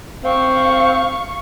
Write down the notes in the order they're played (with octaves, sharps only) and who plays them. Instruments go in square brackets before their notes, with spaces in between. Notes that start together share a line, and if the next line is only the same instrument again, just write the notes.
[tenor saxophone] C4 [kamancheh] F5 C#6